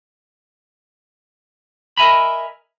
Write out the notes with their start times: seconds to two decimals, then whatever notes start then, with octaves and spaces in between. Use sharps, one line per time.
1.97 A#4 D#5 E5 G#5 A#5 B5